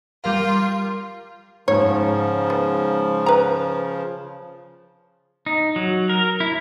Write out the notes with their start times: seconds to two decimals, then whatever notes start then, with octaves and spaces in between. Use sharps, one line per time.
0.24 G3 F4 A#4 F5
1.68 G#2 C#3 F3 C#5
2.50 B3
3.26 B4 A#5
5.46 D#4
5.76 F#3
6.09 A#4
6.40 E4